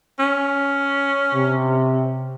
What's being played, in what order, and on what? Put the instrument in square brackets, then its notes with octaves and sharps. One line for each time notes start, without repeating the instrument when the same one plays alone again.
[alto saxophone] C#4
[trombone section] C3